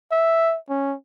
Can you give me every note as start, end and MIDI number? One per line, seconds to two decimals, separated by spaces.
0.11 0.57 76
0.69 0.95 61